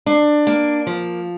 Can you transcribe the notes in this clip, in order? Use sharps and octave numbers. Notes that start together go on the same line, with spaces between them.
D4
A#3
F3